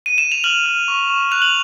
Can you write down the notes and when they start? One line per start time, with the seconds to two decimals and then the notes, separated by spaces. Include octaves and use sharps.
0.06 D#7
0.18 E7
0.32 F7
0.44 F6 F#7
0.66 F6
0.88 C#6
1.10 C#6
1.32 F#6 F7
1.42 F#7